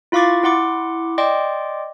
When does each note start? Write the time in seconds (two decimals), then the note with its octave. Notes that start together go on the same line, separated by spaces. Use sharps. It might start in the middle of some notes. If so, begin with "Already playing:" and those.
0.12 E4 F4 F5 C#6 D6 A6
0.43 E4 F#5 C6 D6
1.18 D5 D#5 G5 C6 D6